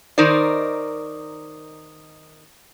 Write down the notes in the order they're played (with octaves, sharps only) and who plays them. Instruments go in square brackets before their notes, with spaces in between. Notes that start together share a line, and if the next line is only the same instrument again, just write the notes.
[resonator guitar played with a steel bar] D#3 D#4 A#4 C5 D5